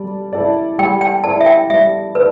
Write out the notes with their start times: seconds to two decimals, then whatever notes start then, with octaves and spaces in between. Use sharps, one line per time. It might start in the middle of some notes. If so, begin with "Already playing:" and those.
Already playing: G3 A4 D5
0.33 E4 A4 D5
0.79 G3 G5
1.01 G5
1.24 E4 A4 D5 A5
1.41 E5
1.46 G5
1.69 G3 E5
2.15 E4 A4 B4 D5